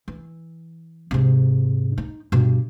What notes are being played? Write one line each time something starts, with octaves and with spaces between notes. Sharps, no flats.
E3
G#2 C3
D#4
G2 B2